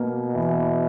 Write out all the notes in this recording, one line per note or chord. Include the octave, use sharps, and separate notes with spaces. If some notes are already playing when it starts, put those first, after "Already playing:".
Already playing: B2 A#3
E3